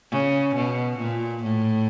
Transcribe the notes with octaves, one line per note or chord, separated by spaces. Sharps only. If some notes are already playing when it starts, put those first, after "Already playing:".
C#3
B2
A#2
A2